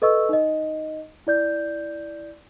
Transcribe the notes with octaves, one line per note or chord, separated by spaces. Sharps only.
A4 B4 D#5 C#6 E6
D#4 D#5
E4 D5 G6